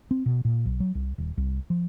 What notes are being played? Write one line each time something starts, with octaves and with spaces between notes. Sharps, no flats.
C4
B2
A#2
B1
F#3
C2
D#1
C2
F3